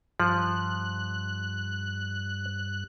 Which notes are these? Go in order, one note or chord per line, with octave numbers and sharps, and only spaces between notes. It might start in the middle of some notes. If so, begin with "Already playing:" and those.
G2 F3 F#6